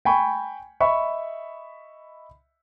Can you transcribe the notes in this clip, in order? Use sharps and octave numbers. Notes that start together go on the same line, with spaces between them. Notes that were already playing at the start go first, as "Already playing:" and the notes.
G5 G#5 B5 C#6
D#5 E5 B5 C#6